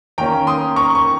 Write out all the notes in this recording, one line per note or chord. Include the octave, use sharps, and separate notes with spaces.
D#3 A#3 C#4 G5 A#5
C6 D#6
A#5 C#6
C#6